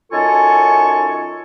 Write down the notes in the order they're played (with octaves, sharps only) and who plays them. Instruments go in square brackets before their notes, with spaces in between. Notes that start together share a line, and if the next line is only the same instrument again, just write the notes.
[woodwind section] F#2 D#4 F4 A4 G#5 C#6